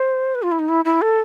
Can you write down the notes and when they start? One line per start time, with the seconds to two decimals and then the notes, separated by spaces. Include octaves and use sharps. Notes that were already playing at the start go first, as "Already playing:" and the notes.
Already playing: C5
0.35 B4
0.42 F4
0.52 E4
0.59 D#4
0.69 E4
0.85 E4
1.02 A4